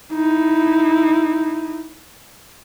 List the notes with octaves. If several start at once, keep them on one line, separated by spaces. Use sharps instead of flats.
D#4 E4